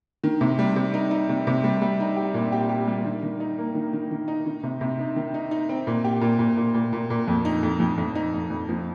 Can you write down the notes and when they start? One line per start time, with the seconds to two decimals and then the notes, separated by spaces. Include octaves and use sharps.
0.24 D#3
0.41 C3
0.59 G3
0.76 C3
0.94 D#4
1.11 D#4
1.29 C3
1.47 C3
1.64 G3
1.82 G3
2.00 D#4
2.16 G4
2.34 A#2
2.52 G4
2.69 G4
2.87 G3
3.05 D#3
3.23 D#3
3.40 D#4
3.58 A#3
3.75 D#3
3.93 D#3
4.11 D#3
4.28 D#4
4.46 D#3
4.63 C3
4.81 C3
4.99 D#4
5.16 D#3
5.34 D#4
5.51 D#4
5.69 C4
5.87 A#2
6.04 G4
6.21 A#2
6.39 A#2
6.57 A#2
6.74 A#2
6.93 A#2
7.10 A#2
7.28 F2
7.45 D#4
7.63 F2
7.80 F2
7.98 F2
8.15 D#4
8.34 F2
8.50 F2
8.69 F3